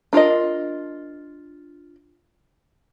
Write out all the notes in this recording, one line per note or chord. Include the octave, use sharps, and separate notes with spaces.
D4 F4 A#4 D#5